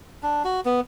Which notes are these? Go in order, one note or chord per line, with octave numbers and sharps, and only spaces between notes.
D4
F#4
B3